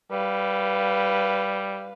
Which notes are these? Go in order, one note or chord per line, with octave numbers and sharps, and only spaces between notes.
G3 B4 F5